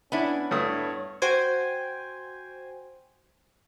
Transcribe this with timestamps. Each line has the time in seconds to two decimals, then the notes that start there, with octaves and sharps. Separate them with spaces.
0.12 B3 C#4 D4 E4
0.51 G2 A3 C#5 D#6
1.22 F#4 C5 G5 G#5